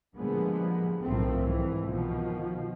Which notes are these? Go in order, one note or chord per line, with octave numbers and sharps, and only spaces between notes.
A#2 D3 F3 G3 G#3 B3
B1 A2 D#3 F3 A3 C4
C2 G#2 E3
B2 D#3 F3